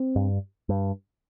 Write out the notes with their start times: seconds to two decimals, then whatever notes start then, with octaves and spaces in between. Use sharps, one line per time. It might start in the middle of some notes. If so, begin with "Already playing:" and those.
Already playing: C4
0.16 G2
0.69 G2